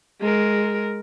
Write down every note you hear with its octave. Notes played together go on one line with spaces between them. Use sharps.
G#3 A#4